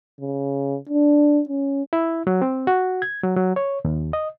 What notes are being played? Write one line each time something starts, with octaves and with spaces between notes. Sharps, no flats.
C#3
D4
C#4
E4
F#3
C4
F#4
G#6
F#3
F#3
C#5
D#2
D#5